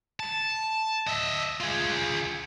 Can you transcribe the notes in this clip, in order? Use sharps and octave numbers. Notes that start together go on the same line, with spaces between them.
A5
D#5 E5
F4 G#4